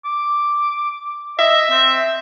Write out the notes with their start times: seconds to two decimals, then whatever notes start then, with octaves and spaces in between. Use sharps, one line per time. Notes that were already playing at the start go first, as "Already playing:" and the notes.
0.05 D6
1.39 D#5 E5
1.71 C4